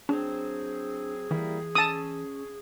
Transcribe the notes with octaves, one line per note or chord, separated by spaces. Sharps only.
F#3 C4 D4 G#4
E3 G3 A#3 E4
C#4 A5 D#6 E6